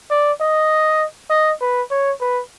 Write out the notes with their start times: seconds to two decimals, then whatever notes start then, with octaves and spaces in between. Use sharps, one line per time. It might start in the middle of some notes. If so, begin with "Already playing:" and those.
0.11 D5
0.41 D#5
1.30 D#5
1.61 B4
1.91 C#5
2.21 B4